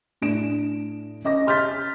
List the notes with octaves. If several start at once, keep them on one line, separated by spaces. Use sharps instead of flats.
A2 D4 D7 E7
C#4 D#5 D6 A#6
C6 F6 G6 A6 B6